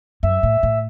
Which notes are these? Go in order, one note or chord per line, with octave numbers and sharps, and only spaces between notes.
F#2 E5
A2
A2